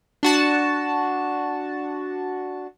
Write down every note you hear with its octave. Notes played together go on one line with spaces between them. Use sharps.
D4 F#4 A5